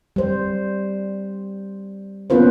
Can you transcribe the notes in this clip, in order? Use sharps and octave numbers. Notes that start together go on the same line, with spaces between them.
G3 C5
A#3 B3 C#4 F4 B4 C5